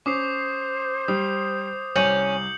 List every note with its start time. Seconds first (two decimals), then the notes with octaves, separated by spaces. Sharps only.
0.06 C#4 C5 D6 D#6 C7
1.08 G3 D#6
1.96 C2 C#4 G6 C#7 F#7